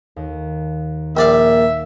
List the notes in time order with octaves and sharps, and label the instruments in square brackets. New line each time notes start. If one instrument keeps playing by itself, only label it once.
[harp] D#2
[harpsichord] A#1 D5 F5 [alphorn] A#3 [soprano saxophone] E5